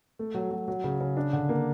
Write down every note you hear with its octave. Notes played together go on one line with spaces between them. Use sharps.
A3
F#3
F#3
F#3
C#3
C#3
D4
D3
A#3